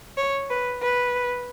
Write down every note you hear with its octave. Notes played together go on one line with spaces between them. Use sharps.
C#5
B4
B4